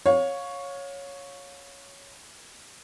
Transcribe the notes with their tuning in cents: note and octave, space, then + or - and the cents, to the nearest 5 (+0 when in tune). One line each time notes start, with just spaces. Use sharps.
C#5 +0 F5 +30